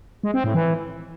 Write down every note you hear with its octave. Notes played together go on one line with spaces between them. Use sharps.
G#3
C4
A2
E3